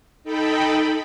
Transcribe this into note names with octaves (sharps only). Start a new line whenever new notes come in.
D#4 A4 G5 B5